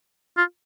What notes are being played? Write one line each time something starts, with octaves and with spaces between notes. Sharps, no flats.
F4